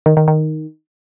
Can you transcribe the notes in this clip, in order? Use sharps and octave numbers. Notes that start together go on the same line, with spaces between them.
D#3
D#3
D#3